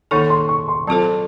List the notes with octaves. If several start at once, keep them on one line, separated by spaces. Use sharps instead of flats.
D#3 A#3 D#4 A4 C#5 C#6
C6
C#6
C6
F#3 C4 F4 A4 C5 A5